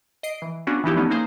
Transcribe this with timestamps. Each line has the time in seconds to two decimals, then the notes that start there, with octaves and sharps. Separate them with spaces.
0.23 D#5 C7 D7
0.42 E3
0.67 B3 C#4 D4 F4 F#4
0.84 E3 F3 B3 D#4 E4 G4
0.95 D3 E3 A3 B3 C#4 D#4
1.10 A#3 D#4 G#4 C5